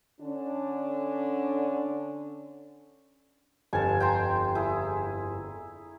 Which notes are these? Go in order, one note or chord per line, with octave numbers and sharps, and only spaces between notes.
D3 C#4 D4
G1 F2 G#5 A5
G5 A#5 C6
E4 G#4